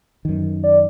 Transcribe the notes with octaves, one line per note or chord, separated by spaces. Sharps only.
F#2 D#3
D5